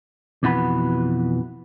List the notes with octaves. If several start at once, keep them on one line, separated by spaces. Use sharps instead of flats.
F2 B2 E3 F#4 B4 B5